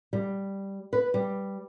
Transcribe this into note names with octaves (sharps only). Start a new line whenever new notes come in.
G3
B4
G3